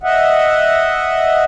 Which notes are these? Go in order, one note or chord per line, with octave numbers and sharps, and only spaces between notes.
D#5 E5 F#5